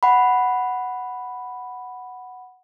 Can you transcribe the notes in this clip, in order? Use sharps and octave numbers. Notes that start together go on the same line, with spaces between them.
F#5 B5